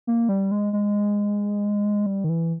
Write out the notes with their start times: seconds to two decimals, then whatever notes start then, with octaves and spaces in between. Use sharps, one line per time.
0.07 A#3
0.29 G3
0.51 G#3
0.73 G#3
2.06 G3
2.24 D#3
2.29 E3